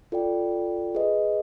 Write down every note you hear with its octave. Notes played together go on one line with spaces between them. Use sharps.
F4 A4 D5 G5
G#4 B4 D#5